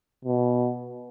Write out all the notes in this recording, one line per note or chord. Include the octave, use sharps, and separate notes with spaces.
B2